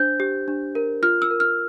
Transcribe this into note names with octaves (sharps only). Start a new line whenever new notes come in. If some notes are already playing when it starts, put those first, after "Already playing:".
Already playing: D4 C5 G6
G4
D4
A#4
F4 F6
E6
A#4
F6